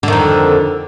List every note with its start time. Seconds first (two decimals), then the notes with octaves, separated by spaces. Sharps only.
0.03 D3
0.08 D#3
0.13 F2